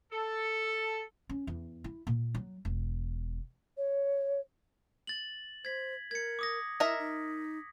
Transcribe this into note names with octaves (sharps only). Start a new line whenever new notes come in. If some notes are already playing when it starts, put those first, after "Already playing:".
A4
C#4
E2
E4
A#2
F#3
E1
C#5
A6 F#7
C5 G#6 B6
A#4 G#6 C#7
D6 D#6 A#6
E4 A#4 D#5 E5 A#6 B6
D#4